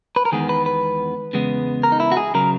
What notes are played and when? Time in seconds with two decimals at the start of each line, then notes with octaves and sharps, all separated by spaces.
0.16 B4
0.25 A#4
0.32 E2 D#3 G#3 B3 G#4
0.49 B4
0.66 B4
1.33 E2 C#3 G#3 B3
1.83 A#4
1.92 D#4
2.00 E4
2.12 F#4
2.17 G#4
2.34 C#3 F#3 A#4